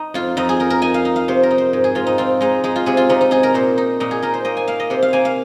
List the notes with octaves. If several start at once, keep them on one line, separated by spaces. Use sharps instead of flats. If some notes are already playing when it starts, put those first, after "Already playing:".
Already playing: D#4
F2 F4
F2 D#4
G#4
D#4 A#4
A#4
D#4 G#5
F5
D#4
F5
C3 C5
A#4
D#4
C5
G#2
G#4
G#2 F4
D#4
C4 F4
G#3 D#4
G#3 D#4
F4
C3 G#4
F4
C3 D#4
D#4
D#4 G#4
A#4
A#2 C5
D#4
A#2 D#4
G#4
D#4 A#4
C5
A#3 D#5
G#5
A#3 F5
D#5
C3 C5
F5
A#3 G#5
F5